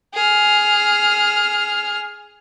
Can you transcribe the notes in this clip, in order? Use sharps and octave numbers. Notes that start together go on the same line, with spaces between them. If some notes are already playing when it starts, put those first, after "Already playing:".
G#4 F6